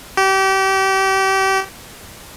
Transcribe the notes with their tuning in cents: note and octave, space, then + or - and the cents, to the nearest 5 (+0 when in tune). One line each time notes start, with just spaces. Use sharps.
G4 -30